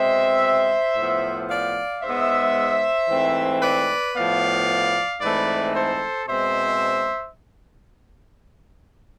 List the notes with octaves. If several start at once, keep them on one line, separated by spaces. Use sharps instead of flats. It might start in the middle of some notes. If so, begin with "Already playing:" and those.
Already playing: B2 G#3 C4 C5 E5
A2 F3 B3
D5 F5
G#2 G#3 B3 C5 E5
G#2 E3 A3 C4
B4 D5
A2 F3 B3 D5 F5
G#2 E3 A3 C4 B4 D5
A4 C5
B2 G#3 C4 C5 E5